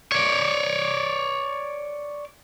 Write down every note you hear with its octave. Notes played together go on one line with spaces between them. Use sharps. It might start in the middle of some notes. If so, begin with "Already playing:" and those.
C#5 D5